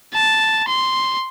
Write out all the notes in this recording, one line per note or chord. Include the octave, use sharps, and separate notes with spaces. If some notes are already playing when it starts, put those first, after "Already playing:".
A5
C6